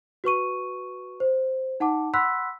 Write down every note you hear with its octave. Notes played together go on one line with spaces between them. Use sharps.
F#4 B4 C#6 D#7
C5
D#4 F#5 A5 D6
F#5 B5 C6 E6 F#6 B6